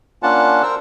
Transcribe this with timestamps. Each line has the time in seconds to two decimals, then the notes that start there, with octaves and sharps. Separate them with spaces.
0.23 A#3 C#4 D4 F4 F#5 A5
0.63 A#4 C5 E6